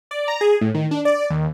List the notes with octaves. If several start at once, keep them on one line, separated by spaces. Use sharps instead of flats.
D5
A#5
G#4
A2
D#3
D4
D5
D#2